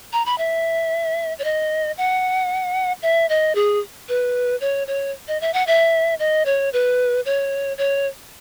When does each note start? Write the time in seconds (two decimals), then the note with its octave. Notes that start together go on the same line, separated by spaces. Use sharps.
0.13 A#5
0.26 B5
0.38 E5
1.39 C#5
1.44 D#5
1.98 F#5
3.02 E5
3.29 D#5
3.55 G#4
4.09 B4
4.61 C#5
4.87 C#5
5.28 D#5
5.41 E5
5.53 F#5
5.67 E5
6.19 D#5
6.46 C#5
6.73 B4
7.25 C#5
7.78 C#5